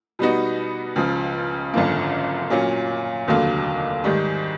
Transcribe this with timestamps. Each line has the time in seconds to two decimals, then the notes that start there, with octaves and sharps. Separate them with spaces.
0.19 B2 G3 B3 D#4 F#4
0.96 C#2 C#3 F3
1.74 G#1 F#2 D3 F3 A#3
2.50 A#2 F#3 A#3 C#4
3.28 F1 D#2 D3 F#3 A#3
4.04 G#2 D#3 G3